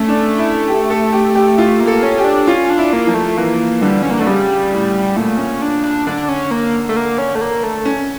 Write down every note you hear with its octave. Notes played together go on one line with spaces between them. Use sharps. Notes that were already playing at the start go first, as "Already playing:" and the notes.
Already playing: A3 C#4
D4
E4
G4
A4
G4
G4
A3 F4
A#3
A4
C#4
G4
D4
C#4 F4
D4
E4
A#3
F3
A3
E3 A#3
D3 G3
C#4
A#3
D3 A3
C#3 G3
A2
A#2 A3
C#4
D4
D4
D3 D4
D4
C#4
A#3
A3
A#3
C#4
A3
A#3
A3
C#4